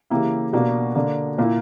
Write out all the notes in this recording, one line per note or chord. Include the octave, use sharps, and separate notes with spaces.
C#3 E3 A#3 E4 G4
B2 A#3 D4 F#4
D3 A#3 D4
A#2 A#3 E4